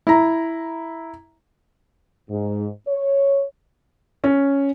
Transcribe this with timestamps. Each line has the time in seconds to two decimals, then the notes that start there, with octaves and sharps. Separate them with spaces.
0.07 E4 A#5
2.29 G#2
2.87 C#5
4.24 C#4